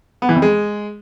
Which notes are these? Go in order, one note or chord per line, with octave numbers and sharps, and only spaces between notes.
B3
E3
F2
G#3